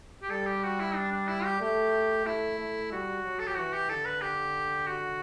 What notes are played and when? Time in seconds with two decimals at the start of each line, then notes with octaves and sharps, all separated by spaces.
0.22 G4
0.31 G3 A4
0.47 G4
0.64 F#4
0.80 E4
0.96 D4
1.12 D4
1.28 E4
1.45 G4
1.61 A3 G4
2.26 A3 E4
2.60 A3
2.91 G3 F#4
3.24 F#3
3.40 A4
3.47 G4
3.56 E3 F#4
3.73 G4
3.90 D3 A4
4.05 B4
4.21 G4
4.87 F#4